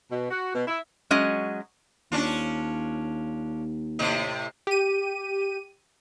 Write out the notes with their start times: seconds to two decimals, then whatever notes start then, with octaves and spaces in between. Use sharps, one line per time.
0.10 B2
0.31 F#4
0.54 B2
0.67 E4
1.11 F#3 G#3 C#4 D#5
2.12 D#2 C#4 D4 F4
3.99 A2 C3 D#5
4.67 G4 D#7